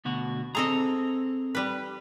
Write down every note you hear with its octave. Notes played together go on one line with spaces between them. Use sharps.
D2 B2 F#4
C4 G#4 A4 D#5 A#5
G3 B4